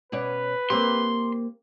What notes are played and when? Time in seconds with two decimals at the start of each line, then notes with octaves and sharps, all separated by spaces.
0.12 B2 C#4 B4 D5
0.70 A#3 C4 G4 C6